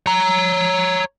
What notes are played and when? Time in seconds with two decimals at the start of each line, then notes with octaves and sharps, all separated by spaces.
0.06 C#5 A#5